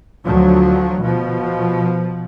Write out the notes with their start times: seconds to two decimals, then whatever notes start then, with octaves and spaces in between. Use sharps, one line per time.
0.25 D2 F3 F#3
1.02 B2 F3